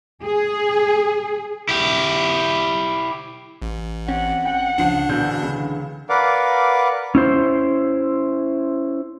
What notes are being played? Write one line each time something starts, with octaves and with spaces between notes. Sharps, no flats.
G#4
E4 G4
A1
C4 C#4 F#5
G5
C#2 C#3 F3 D4 C7
A#1 B2 D3 E3 G6
C#2
A#4 B4 D5 F5 F#5 D6
C#4 E4 C5